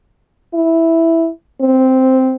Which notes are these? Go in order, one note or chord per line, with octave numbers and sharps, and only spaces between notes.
E4
C4